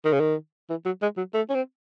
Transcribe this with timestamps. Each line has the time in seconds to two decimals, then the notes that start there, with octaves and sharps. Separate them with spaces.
0.05 D#3
0.13 C#3
0.20 D#3
0.69 E3
0.85 F#3
1.02 G#3
1.17 F#3
1.34 A3
1.49 C#4
1.55 C4